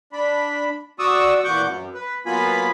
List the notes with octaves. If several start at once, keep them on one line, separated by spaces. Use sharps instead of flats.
D4 B5
F#4 D5 C#6 D#6 E6
E2 A#2 F#5 C#6 D6 G6
F#2
B4
F#3 A#3 B3 F4 G#5 B5